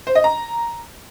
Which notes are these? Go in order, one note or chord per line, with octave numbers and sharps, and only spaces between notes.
C5
D#5
A#5